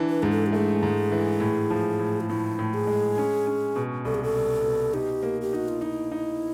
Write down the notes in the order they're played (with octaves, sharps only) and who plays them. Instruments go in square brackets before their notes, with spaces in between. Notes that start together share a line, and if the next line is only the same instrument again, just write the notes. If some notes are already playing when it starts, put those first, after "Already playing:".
Already playing: [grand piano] E3 D4
[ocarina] B4
[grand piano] G#2 [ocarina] G#4
[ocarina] A4
G4
[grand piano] A3 [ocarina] G#4
[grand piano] G#2
E3
A2
F3
A2
[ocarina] F4
[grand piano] A2 [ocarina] E4
[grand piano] A2
[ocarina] G#4
[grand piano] G#3
C#4
C#4
B2
[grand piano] C2 [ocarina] A4
[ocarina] G#4
A4
[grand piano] C2
B2
[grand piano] D#4 [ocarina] G4
[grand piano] A#3
[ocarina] G4
[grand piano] D#4 [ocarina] F#4
[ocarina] F4
[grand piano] D#4 [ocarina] E4
[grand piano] D#4